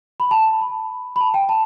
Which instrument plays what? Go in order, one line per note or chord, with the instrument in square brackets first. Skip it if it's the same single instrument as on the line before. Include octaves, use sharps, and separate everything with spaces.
[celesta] B5
A5
B5
B5
A5
G5
A5